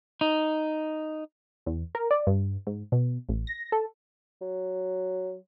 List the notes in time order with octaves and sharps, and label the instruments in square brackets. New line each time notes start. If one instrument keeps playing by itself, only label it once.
[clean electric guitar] D#4
[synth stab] E2
A#4
D5
G2
G#2
B2
A1
A#6
A4
[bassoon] F#3